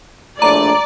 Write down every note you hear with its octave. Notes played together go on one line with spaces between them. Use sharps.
A#1 A2 D4 D5 A#5